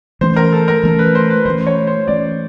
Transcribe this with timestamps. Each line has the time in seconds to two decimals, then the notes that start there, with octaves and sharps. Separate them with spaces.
0.21 E3 A3 C#4 C5
0.36 A#4
0.53 A4
0.68 A#4
0.83 E3 A3 C#4
0.99 B4
1.15 C5
1.30 B4
1.45 E3 A3 C#4 C5
1.67 C#5
1.87 C5
2.08 E3 A3 C#4 D5